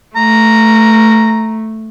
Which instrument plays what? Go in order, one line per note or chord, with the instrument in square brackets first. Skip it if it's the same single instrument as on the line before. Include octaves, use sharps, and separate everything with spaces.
[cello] A3 [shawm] A#5